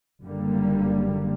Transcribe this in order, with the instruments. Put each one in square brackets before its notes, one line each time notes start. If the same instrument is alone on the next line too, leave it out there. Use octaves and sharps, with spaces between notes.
[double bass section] F#1 D3 G3 A#3